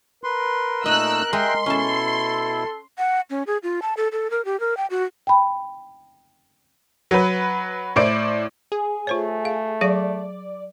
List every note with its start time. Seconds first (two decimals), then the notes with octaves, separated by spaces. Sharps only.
0.24 A#4 B4 C6
0.86 A#2 A3 D#4 D#5 E6 F#6
1.33 G#3 E5 G5 C6 F#6
1.66 B2 C#4 E4 A4 A5
2.98 F#5
3.30 C#4
3.47 G#4
3.63 F4
3.82 A5
3.97 A4
4.12 A4
4.31 A#4
4.45 G4
4.60 A#4
4.77 G5
4.90 F#4
5.27 G5 B5
7.11 F#3 B4
7.96 A2 E4 C5 D5 D7
8.72 G#4
9.07 A3 F4 C5 C#5
9.45 F5
9.81 F#3 G#4 D5 F5